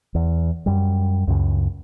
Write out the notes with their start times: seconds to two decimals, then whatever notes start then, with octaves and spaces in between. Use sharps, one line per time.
0.15 E2
0.66 F#2 G3
1.27 C#2 F#2 C#3